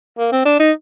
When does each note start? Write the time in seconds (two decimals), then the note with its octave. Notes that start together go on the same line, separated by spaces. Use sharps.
0.18 A#3
0.32 C4
0.45 D4
0.60 D#4